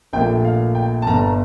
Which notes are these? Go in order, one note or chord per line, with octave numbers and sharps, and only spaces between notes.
A#1 A#2 A3 G5
F5
G5
A5
G1 G2 D3 A#5